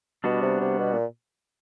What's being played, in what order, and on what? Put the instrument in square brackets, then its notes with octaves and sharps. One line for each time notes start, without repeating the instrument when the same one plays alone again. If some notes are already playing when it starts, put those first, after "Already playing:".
[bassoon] B2 [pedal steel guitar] G3 B3 D4 F#4
[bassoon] C3
C3
B2
A#2